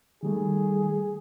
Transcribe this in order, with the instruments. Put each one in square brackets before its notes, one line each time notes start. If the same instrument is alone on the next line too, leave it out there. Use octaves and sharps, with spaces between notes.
[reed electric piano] D#3 G3 A3 [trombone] G#4